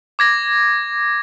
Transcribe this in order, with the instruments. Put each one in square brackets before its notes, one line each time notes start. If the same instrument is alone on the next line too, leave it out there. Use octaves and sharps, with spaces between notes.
[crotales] D6 G#6 A#6